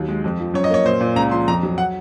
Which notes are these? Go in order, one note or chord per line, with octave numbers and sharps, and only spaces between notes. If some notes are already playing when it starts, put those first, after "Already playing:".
Already playing: D#2 F#3
G#3
F2
F3
F#2 C#5
D#5
A#3 C#5
A#2 C5
A#2
C#2 A#5
F3 C6
F2 A#5
F#3
F#5